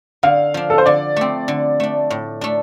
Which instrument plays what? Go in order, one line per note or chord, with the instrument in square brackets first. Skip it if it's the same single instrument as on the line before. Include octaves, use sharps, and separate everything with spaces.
[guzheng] D3 [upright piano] F5
[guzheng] F3 D4
[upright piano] A4
C5
[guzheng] D3 [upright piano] D5
[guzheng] A3 C4
D3
A3 D4
A2
A3 D4